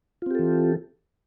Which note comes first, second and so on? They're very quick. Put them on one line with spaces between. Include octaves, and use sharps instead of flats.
F4 C4 G4 A4 E3